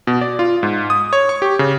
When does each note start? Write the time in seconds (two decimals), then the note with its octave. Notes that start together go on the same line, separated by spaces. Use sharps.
0.07 B2
0.21 D5
0.39 F4
0.63 G#2
0.90 D#6
1.13 C#5
1.29 C#6
1.42 G4
1.59 C#3